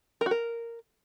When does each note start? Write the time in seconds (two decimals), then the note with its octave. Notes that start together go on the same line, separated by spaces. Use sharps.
0.21 A#4
0.26 F#4
0.31 A#4